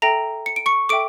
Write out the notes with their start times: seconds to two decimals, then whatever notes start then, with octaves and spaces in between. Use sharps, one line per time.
0.02 A4 E5 G5 A#5 A#6
0.46 C#7
0.56 D7
0.66 C#6 C#7
0.89 A4 E5 G5 D6 D7